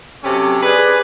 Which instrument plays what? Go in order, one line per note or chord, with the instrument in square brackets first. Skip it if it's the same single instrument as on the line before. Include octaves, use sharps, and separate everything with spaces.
[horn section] F#2 C3 C#4 G4 A4 C#5
G#4 B4 D5